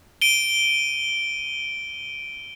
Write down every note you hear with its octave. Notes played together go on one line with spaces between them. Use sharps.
D7 D#7 G7